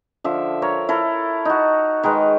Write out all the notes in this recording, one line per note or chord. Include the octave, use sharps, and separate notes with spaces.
D3 F3 E5
A#4 C#5
E4 A4 A#4
D#4 F#4
D#3 G#3 A#4 B4